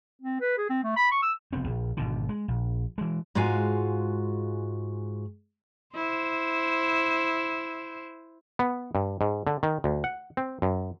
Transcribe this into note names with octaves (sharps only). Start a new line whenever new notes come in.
C4
B4
G#4
C4
A3
B5
C#6
E6
F1 B3 C4
A#1
G#1 B2 D3
G#3
A#1
E3 G#3
G#2 G#3 F4 F#4 F5 G#5
E4 C5
B3
G2
G#2
D3
D#3
D2
F#5
C4
F#2